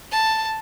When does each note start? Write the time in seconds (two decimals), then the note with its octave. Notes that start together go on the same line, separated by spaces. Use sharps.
0.12 A5